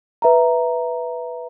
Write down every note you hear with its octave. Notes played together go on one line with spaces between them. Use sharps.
B4 E5 A#5